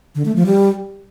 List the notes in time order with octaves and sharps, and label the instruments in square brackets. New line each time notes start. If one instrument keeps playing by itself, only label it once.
[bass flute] D3
A3
F3
G3